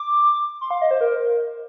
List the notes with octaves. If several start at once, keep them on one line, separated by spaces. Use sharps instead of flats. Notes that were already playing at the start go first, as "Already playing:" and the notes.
Already playing: D6
C6
F5
D#5
C5
A#4